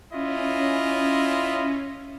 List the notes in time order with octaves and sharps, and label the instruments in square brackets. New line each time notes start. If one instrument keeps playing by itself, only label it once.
[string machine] C#4 [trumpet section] E4 F4 D#5